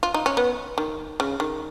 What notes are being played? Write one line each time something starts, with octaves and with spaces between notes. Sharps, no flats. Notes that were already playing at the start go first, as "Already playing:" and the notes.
F4
D#4
C#4
B3
D#3
C#3
D#3